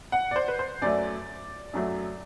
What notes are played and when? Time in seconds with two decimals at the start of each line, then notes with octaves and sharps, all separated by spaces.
0.12 F#5
0.31 D5
0.36 C5
0.48 B4
0.59 C5
0.82 F#2 F#3 A3 D5
1.73 F#2 F#3 A3